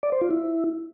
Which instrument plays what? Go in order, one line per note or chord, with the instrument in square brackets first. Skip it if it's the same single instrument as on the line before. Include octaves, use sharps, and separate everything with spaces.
[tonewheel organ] D5
C5
F4
E4